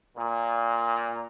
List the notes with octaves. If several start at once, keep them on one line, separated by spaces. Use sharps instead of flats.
A#2